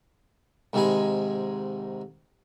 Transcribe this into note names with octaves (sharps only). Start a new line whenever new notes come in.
G#2 C3 D#3 G#3 G#5 B5